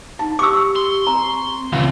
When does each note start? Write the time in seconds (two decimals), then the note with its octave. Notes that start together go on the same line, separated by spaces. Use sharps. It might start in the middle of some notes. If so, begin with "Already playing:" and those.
0.19 D#4 A5
0.39 G4 C#6 D6 E6
0.75 C6
1.07 C4 A#5
1.73 C#2 E3